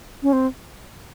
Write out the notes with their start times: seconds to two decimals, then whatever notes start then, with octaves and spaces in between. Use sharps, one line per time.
0.23 C#4
0.33 C4